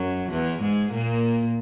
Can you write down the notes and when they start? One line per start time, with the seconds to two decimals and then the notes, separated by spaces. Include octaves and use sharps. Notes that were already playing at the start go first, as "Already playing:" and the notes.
Already playing: F#2 F#3
0.31 E2 E3
0.61 G#2 G#3
0.91 A#2 A#3